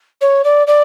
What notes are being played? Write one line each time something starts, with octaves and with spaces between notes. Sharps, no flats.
C#5
D5
D5